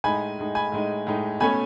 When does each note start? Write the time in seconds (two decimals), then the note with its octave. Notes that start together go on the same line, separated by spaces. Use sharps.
0.04 A2 G#3 D#4 G#5 B5
0.39 A2 G#3 D#4
0.55 G#5 B5
0.72 A2 G#3 D#4
1.07 A2 G#3 D#4
1.40 B2 A3 C#4 G#5 B5